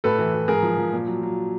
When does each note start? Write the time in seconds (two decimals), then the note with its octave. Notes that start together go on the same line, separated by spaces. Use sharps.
0.04 A2 A4 B4
0.19 E3
0.34 E3
0.48 G#2 G#4 A#4
0.63 F3
0.78 F3
0.93 A#2
1.07 F#3
1.23 F#3